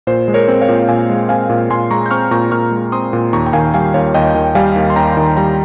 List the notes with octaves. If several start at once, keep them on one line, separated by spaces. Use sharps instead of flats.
A#2 C5
G#3
A#4 C#5
C4
C#5 F5
A#2
A#2 F5 G#5
G#3
C4 F5 G#5
A#2
A#2 G#5 C6
G#3 A#5 C#6
G6
C4 C#6 F6
A#2 A#5 C#6
A#2 C#6 F6
G#3
C4 C6 D#6
A#2
D#2 A#5 C#6
G5
D#3 F5 G#5
G3 F5 G#5
D#2 C#5 F5
D#2 D#5 G5
D#3
G3 F5 G#5
D#2
C6
D#2 G5 A#5
D#3
G3 G5 A#5